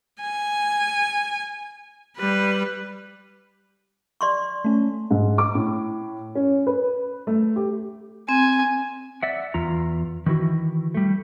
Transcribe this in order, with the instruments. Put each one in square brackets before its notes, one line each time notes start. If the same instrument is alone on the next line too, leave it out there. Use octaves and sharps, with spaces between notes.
[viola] G#5
G3 B4
[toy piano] D5 C6 C#6
[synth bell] A3 C#4
[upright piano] G#2
D6
A2
C#4
B4
A3
G4
[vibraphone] C4 [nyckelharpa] G#5
[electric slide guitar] D5 E5 F#5
E2 F4 A#5
D#3 E3 E4 F#4
G3 A3